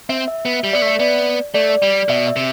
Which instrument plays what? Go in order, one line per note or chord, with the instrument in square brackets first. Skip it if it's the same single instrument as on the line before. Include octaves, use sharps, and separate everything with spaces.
[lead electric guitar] C4 [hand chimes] E5
[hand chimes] E5
[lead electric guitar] B3
[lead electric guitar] G3 [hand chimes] E5
[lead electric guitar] B3 [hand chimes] D5
[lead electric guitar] A3 [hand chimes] E5
[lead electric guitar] B3 [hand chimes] D5
[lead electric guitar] A3 [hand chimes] D5
[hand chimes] D5
[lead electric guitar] G3 [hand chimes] D5
[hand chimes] D5
[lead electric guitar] B2 [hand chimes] E5
[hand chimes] E5
[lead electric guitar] C3